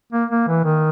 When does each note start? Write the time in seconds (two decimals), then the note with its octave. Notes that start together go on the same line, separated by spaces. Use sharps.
0.12 A#3
0.31 A#3
0.48 E3
0.65 D#3